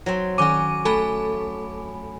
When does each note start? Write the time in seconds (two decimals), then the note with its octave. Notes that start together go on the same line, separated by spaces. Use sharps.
0.06 F#3 C4
0.38 D#3 C#4 F#4 G#5 D6 D#7
0.85 A3 A4 G#5 B5